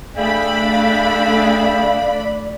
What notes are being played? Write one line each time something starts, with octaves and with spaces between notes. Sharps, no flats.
A3 D4 G#4 D5 E5 F5 G5 B5